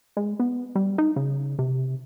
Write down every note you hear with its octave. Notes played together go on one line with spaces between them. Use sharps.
G#3
B3
G3
D#4
C#3
C3